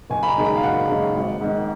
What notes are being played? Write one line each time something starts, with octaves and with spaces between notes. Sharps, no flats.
F#1 G#5
B5
A#5
F#2 D#3 G#3
A#5
F5
F#1 F#5
F#2 D#3 G#3
G#1
G#2 D#3